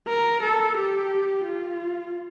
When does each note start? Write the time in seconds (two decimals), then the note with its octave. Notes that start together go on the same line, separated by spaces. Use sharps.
0.08 A#4
0.42 A4
0.76 G4
1.45 F4